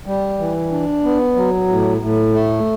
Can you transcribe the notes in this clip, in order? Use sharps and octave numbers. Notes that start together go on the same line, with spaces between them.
G3
E3
D4
B3
F#3
A2
A2
A3